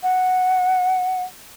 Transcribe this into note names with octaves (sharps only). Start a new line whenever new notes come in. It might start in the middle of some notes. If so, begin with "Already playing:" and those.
F#5